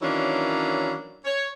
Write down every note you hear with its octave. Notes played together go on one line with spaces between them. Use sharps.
D#3 E3 F#3 A#3 C#4 D4
C#5